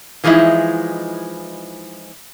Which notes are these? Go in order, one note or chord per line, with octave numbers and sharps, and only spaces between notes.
E3 F3 G#3 D#4 E4